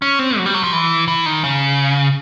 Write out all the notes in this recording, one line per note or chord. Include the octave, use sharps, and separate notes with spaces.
C#4
C4
F#3
G3
F#3
F3
E3
E3
D#3
C#3